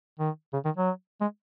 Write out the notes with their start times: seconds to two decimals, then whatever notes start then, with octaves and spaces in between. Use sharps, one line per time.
0.20 D#3
0.53 C#3
0.65 D#3
0.77 F#3
1.21 G#3